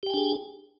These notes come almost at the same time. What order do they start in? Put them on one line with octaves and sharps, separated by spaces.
G4 G5 G#5 D4 G#4